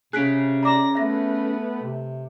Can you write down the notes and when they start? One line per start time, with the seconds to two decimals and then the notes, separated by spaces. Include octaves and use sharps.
0.13 C3 C#4 G#4 F#6 B6 D7
0.63 D5 A#5 D6 A#6 E7
0.95 A3 B3 B4 E5 A#6
1.82 C3